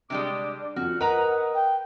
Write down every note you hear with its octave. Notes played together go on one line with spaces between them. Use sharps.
C3 G3 G#3 D4 D6
F2 F#4 F6
A#4 B4 D#5 F#5 A#5
G5